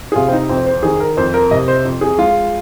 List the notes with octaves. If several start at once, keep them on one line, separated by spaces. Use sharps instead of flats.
G#4
C3 F4
C4
D#4
F2 C4
C5
D#3 G#4
A#4
F2 C5
A#4
C3 D#5
C5
F2
G#4
G#3 F4